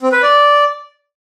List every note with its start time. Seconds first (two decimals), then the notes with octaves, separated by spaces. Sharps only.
0.02 C4
0.12 B4
0.22 D5